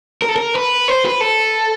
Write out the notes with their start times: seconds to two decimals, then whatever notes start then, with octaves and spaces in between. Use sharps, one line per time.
0.22 A#4
0.29 A4
0.36 A#4
0.56 B4
0.88 C5
1.05 B4
1.21 A4